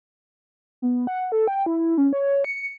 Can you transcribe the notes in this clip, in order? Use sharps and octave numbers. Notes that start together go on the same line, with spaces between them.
B3
F#5
A4
G5
E4
C#4
C#5
C#7